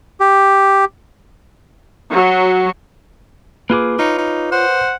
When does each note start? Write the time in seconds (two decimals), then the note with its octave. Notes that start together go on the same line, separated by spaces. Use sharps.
0.20 G4
2.13 F#3
3.70 A#3 F4 G#4 B4 D6
3.99 D#4 F4 C#5
4.18 D#4
4.52 C5 F#5